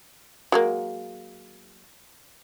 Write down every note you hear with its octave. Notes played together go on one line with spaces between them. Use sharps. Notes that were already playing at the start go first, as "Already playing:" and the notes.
F#3 G#3 A#3